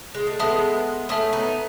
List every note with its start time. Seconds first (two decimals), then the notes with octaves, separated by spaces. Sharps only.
0.15 G#3
0.27 A3
0.39 G#3 B3 A4 E5 A5 D#6
1.09 A3 C#4 A4 E5 A5 D#6
1.33 B3 D#4